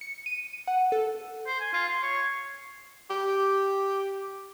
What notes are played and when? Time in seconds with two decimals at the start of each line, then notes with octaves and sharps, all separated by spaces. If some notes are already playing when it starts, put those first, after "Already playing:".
0.01 C#7
0.26 D#7
0.67 F#5
0.92 A4
1.47 C5
1.60 G#5
1.73 F4
1.89 C6
2.03 C#5
3.10 G4